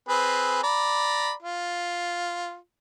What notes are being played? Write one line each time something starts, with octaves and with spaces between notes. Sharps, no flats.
C4 G#4 B4
D5 A#5 B5
F4